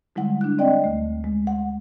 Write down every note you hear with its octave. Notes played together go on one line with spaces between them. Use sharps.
D3 G3 G#3 E4 F#5
D4 F#6
C4 D5 D#5 G5
D2 A3
G#3
F#5